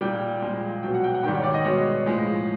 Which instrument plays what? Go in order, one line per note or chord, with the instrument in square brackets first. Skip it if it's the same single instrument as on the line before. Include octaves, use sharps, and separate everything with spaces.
[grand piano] A#2 G3 G5
A#2 F3 G#3
B2 F#3 G5
F#5
G5
F#5
G#2 D#3 G3 G5
C#5
D5
D#5
B2 G#3 C#5
A2 F3 G#3